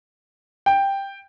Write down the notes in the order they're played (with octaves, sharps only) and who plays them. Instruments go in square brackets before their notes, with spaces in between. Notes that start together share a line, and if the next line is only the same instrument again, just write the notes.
[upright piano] G5